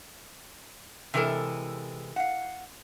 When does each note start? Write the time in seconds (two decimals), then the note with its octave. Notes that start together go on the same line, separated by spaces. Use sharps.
1.14 C3 E3 G#3 A4 A#4
2.16 F5 F#5